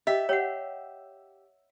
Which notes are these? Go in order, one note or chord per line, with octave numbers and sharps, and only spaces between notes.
G4 D#5 E5
G4 C#5 F#5